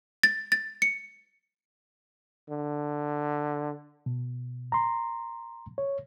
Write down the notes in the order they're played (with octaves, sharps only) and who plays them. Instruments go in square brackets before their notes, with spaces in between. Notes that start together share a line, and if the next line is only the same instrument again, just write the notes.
[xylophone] A6
A6
C#7
[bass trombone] D3
[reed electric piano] B2
A#5 C6
C#5